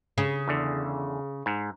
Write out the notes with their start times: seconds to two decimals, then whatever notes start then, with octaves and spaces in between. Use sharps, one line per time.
0.18 C#3
0.48 E2 D3
1.46 G#2